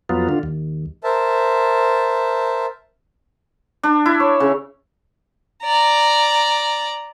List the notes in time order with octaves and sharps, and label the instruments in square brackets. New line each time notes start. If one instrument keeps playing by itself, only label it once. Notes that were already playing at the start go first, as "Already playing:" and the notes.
[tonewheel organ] F2 F#3 B3 F4
D3 F4
D#2
[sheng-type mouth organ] A#4 C5 E5 A5
[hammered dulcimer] D4
E4
C#5
C#3
[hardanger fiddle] D5 A#5